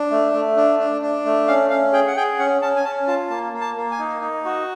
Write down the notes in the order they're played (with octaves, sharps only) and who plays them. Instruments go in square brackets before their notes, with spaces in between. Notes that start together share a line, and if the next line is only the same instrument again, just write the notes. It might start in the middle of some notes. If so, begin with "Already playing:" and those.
Already playing: [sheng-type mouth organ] D4
A3
A3
D4
D4
D4
A3
C#4 F5
C#4 F5
G#4 G5
F#5
G#4 G5
C#4 F#5
C#4 A5
G#5
C#4 A5
F4 A5
A#3 A5
A#3
A5
A#3
G#5
D#4
D#4
F#4